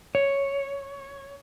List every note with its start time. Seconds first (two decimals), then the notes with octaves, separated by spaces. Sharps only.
0.15 C#5